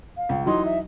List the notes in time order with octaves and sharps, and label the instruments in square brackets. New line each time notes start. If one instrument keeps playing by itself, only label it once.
[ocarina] F5
[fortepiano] C#2
[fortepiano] E3 F#3 D#4 [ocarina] C6
[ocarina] E5